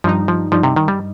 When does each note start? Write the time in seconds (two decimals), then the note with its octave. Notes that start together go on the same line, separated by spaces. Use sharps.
0.04 G2 F3 G3 D#4
0.28 F3
0.52 G2 F3 G3 D#4
0.63 C3
0.76 D#3
0.88 G3